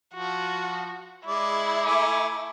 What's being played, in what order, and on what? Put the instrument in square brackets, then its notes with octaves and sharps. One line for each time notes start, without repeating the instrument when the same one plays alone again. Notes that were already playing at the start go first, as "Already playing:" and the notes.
[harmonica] F3 [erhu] F#4
[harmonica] G#3 D5 [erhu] E4
[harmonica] A3 G#5 D6